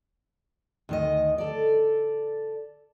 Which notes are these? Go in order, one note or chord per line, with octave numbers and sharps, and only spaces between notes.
D2 D#3 D#5
A4 D5